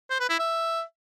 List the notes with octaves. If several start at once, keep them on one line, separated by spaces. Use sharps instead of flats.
C5
B4
E4
E5